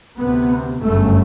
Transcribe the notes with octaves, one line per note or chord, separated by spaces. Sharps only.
D2 C3 B3
G1 F#2 C#3 A3